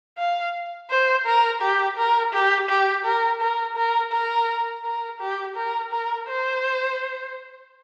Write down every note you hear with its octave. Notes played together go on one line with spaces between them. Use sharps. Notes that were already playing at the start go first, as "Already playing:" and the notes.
F5
C5
A#4
G4
A#4
G4
G4
A#4
A#4
A#4
A#4
A#4
G4
A#4
A#4
C5